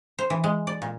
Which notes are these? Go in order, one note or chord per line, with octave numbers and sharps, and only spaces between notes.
C5
E3
G#3
D5
A#2